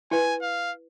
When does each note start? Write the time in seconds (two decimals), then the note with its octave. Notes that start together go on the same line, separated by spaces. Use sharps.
0.11 E4 B4 G#5
0.42 F5